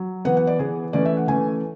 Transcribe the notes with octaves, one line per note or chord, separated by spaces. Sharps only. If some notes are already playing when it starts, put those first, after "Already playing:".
Already playing: F#3
E3 B3 F#5
F#5
D5
E3 B3 G#4
E3 A3 C#4 D5
E5
F#5
E3 A3 C#4 G#5